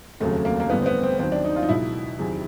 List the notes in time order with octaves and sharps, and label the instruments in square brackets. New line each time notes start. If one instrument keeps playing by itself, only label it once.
[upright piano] F1 D#2 C#3 F#3 A3
A#3
A#3
A1 G2 D3 B3
C4
B3
C4
D#2 D#3 F#3 C4
D4
D#4
F4
D#4
C#2 B2 F#3 E4
E2 C3 D#3 F#3